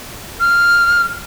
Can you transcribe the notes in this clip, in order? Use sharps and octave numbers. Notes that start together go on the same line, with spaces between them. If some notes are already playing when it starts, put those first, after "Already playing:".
F6